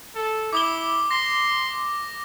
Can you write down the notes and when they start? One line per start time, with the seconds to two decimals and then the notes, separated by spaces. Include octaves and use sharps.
0.16 A4
0.53 E4 D6 D#6 G7
1.11 C6 A#6